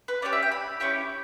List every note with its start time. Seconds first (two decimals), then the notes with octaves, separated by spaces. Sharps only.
0.08 B4
0.22 C#4 E4 G4 D5
0.33 E5
0.42 G5
0.52 B5
0.80 C#4 E4 G4 G5